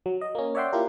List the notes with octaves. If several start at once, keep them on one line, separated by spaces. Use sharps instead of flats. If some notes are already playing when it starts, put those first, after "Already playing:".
F#3
D#5
A#3 C#4
C#5 D5 E5 F#5 G5 C6
A#3 E4 F4 G4 A#4